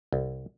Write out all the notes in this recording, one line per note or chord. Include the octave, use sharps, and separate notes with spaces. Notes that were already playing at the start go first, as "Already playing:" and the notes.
C2